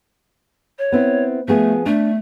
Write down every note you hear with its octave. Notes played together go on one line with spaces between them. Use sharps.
C#5
B3 C4 E4
F3 A3 B3 G#4
A3 D4